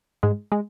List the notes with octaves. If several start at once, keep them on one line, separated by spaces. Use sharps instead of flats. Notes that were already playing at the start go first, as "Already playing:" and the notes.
G#2 G#3
G#3